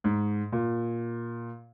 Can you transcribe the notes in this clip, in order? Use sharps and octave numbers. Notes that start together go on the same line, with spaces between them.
G#2
A#2